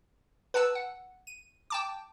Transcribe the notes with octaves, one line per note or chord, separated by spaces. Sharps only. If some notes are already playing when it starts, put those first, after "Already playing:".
B4 F#5 A5 E6
F#5
D#7
G5 A5 D6